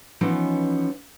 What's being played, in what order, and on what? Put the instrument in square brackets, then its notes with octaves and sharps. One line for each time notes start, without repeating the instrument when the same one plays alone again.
[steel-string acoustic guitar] E3 F3 B3 C#4 D#4